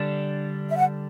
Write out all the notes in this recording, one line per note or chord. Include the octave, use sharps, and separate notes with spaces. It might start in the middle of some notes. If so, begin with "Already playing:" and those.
Already playing: D3 G3 D4
E5
F#5